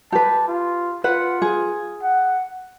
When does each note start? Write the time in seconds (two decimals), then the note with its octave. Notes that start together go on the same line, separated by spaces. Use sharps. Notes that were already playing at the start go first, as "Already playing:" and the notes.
0.12 G4 B4 A5
0.48 F4
1.04 F4 B4 F#5
1.42 G#4
2.03 F#5